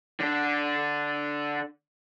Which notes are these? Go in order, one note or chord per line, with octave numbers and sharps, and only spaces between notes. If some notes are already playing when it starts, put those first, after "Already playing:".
D3 D4